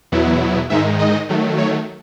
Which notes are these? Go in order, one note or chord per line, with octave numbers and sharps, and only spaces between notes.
E2 B2 F#3 B3 E4
G#2 D#3 G#3 D#4 E5
D#5
D#3 F#3 A3
C#5